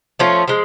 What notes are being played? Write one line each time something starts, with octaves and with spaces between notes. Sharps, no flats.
F3 A3 C#4 F4
F3 G#3